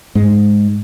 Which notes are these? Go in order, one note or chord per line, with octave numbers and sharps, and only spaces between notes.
G#2 G#3